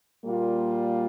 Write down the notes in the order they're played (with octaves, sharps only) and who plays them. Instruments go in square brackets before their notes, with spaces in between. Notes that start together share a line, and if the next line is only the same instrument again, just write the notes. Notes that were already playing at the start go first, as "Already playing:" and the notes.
[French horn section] A#2 G3 A#3 F4